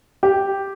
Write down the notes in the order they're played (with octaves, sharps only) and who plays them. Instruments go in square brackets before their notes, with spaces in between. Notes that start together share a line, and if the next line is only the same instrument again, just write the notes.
[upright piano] G4